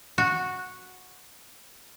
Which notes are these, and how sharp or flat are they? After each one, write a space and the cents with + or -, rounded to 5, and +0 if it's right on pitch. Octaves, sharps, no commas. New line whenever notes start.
F#4 -10